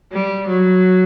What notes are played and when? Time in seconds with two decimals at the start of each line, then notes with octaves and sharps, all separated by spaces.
0.12 G3
0.47 F#3